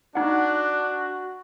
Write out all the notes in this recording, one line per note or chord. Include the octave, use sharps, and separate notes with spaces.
D4 D#4 F#4 F#5